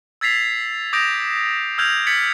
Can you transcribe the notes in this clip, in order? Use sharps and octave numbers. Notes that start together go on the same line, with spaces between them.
E6 G#6 A6 B6 C7 F7
D6 D#6 G6 A#6 D7 F7
E6 F6 G6 G#6 F7
G#6 A6 B6 C#7 F#7